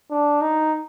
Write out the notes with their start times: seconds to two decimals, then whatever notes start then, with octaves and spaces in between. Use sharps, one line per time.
0.11 D4
0.41 D#4